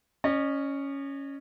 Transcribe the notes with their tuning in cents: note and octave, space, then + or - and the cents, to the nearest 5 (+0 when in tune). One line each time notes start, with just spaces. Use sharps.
C#4 +0 D#5 -40